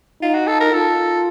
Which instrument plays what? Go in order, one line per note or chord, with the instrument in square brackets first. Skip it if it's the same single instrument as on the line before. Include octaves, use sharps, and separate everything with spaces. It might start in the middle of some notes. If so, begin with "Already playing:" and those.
[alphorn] D#4 [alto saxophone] F4
[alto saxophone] F#4
A4
A#4
[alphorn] F4 [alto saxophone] A4